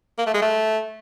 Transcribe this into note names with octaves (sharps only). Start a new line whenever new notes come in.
A#3
A3
G#3
A3